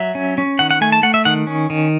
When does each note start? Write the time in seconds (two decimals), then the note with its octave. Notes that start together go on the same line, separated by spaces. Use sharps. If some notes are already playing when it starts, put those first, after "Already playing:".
Already playing: F#3 E5
0.15 C#4
0.38 C#4
0.59 D#3 F#5
0.71 F#5
0.81 A3 G#5
0.92 A5
1.03 A3 F#5
1.14 E5
1.25 D#3 F#5
1.47 C#4
1.70 D#3